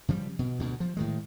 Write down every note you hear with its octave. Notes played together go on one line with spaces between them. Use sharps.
C#3 F3 G3
B2
D2 B2
F3
A2 D#3 G#3